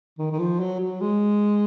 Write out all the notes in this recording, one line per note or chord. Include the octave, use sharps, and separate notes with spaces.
D#3
D#3
F3
F#3
F#3
G#3